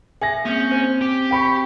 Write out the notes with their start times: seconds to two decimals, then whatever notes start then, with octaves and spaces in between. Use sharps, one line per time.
0.22 G#4 E5 G#5 A#6
0.45 A#3 C4 C#4 G6
0.71 C4 C5
1.01 G4
1.31 G5 B5 C#6